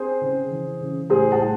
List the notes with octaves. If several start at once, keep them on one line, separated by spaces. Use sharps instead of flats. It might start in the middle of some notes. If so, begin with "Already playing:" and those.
Already playing: C4 G#4 C5
C#3
E3
C#3
A2 G#4 C5
F#5 A5
A2